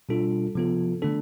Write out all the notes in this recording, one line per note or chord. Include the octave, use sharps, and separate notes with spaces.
B2 G3 D4 F4 A4
C3 F3 B3 F4 A4
D3 A3 D4 A4